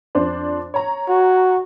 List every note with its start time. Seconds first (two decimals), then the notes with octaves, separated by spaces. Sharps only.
0.15 F2 D4 C5
0.74 C#5 A#5
1.09 F#4